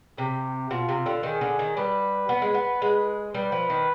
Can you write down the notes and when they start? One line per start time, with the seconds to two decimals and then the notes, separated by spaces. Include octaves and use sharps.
0.18 C3 G4
0.71 B2 F4
0.89 C3
1.06 D3
1.23 D#3 G#4
1.41 D3
1.59 D#3
1.76 G3 B4
2.29 B3
2.42 G#3
2.54 B3
2.82 G#3
3.34 G3 B4
3.52 F3
3.70 D#3